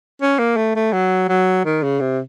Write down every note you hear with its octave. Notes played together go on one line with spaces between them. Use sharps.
C#4
A#3
A3
A3
F#3
F#3
D#3
C#3
C3